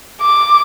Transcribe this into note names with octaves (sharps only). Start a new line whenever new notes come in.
D6